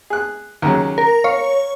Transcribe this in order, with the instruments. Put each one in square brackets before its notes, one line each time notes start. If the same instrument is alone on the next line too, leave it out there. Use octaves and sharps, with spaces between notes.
[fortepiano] G#4 F#6
D#2 C#3 F#3
[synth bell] A#4
[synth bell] C#5 [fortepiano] F5